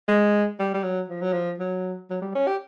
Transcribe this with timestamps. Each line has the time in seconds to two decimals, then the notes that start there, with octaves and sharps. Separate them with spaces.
0.09 G#3
0.59 G3
0.74 G3
0.83 F#3
1.09 F3
1.22 F#3
1.33 F3
1.59 F#3
2.10 F#3
2.22 G3
2.35 C#4
2.47 G4